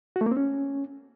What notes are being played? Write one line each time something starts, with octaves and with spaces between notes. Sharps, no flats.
F#4
A3
A#3
C4
C#4